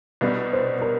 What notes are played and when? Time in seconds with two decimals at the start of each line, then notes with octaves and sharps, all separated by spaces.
0.21 C2 B2 G3 B3 D4 B4
0.53 C5
0.82 A#4